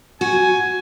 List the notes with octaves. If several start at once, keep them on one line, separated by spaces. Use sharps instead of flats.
F#4 G#5